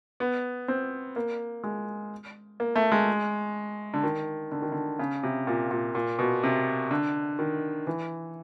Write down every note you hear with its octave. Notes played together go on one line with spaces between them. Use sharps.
B3
C4
A#3
G#3
A#3
A3
G#3
D3
D#3
D3
D#3
D3
C#3
C3
A#2
A#2
A#2
B2
C3
D3
D#3
E3